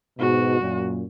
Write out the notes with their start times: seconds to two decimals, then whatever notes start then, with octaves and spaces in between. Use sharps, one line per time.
0.18 G#2 B2 F#4
0.60 F#2 A#2